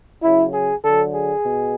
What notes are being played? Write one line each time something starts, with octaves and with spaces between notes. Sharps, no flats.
C#3 F#3 E4
G#4
D3 F#3 A4
G#4
B2